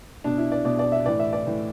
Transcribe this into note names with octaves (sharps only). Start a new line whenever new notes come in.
B2 D4
E4
D5
B2 D5
D5
E5
A2 E3 D5
E5
D5
A2 E3